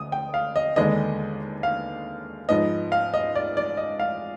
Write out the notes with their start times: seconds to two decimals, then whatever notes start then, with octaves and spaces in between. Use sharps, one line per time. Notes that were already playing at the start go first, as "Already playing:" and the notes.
Already playing: D2 D#6
0.12 G5
0.34 F5
0.56 D#5
0.76 D#2 D3 G#3 B3 D4 D#5
1.63 F5
2.49 G#2 F3 B3 D#5
2.92 F5
3.14 D#5
3.35 D5
3.57 D5
3.77 D#5
4.00 F5